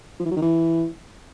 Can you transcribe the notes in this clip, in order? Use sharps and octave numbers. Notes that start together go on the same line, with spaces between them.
F3
E3
F#3
D#3
E3